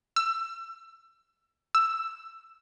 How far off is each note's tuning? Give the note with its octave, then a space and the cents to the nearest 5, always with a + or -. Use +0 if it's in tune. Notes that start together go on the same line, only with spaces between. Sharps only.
E6 +30
E6 +15